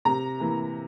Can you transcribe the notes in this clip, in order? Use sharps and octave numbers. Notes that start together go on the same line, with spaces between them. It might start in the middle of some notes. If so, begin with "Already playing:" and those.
C3 A#5
E3 A#3